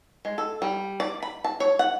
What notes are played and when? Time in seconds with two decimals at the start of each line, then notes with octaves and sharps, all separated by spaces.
0.25 G#3
0.38 A4
0.62 G3
1.00 D5
1.23 B5
1.44 A5
1.60 C#5
1.79 F#5